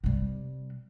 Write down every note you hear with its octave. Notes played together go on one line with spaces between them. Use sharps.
C3 G3